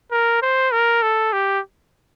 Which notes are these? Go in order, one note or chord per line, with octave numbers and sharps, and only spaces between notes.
A#4
C5
A#4
A4
G4